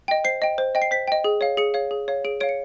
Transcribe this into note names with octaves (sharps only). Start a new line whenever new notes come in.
D#5 G5
C5 C7
D#5 G5
C5
D#5 G5
C7
C5 B6
D#5 G5
G#4
C#5 F5
G#4 C#7
C#5 F5
G#4
C#5 F5
G#4 D7
C#5 F5 D7
C#7